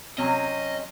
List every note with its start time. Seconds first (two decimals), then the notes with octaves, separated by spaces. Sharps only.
0.18 C3 F#3 C#4 D#5